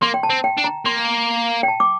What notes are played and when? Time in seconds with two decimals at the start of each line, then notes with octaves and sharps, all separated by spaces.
0.02 A#3 C6
0.14 G5
0.23 A5
0.30 C4
0.44 G5
0.57 D4
0.64 A#5
0.85 A#3 C6
1.63 G5
1.68 A5
1.80 D6